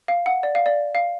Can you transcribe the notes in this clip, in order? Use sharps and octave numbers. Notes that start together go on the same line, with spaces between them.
F5
F#5
D5
F5
D5
F5